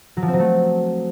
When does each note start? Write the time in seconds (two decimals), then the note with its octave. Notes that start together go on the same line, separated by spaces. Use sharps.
0.17 F#3
0.22 F3
0.28 C4
0.33 F#3
0.39 A3